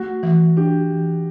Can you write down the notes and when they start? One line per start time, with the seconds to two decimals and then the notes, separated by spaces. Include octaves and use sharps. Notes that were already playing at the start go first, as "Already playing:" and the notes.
Already playing: A3 F#4
0.23 E3
0.57 D4 G4
0.91 E3